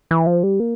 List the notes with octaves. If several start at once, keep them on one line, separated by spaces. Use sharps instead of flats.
E3
F3
G3
A#3